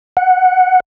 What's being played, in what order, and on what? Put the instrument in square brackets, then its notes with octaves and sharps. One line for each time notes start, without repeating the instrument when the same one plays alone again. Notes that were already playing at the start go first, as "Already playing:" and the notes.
[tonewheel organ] F#5